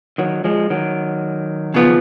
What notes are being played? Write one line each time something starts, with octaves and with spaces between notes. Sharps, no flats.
D#3 F#3
F3 G#3
D#3 F#3
C#3 F3 B3 F4